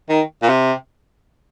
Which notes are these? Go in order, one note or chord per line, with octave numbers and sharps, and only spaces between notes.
D#3
A#2
C3